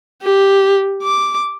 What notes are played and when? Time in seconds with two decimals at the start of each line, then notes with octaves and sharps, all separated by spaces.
0.23 G4
1.03 D6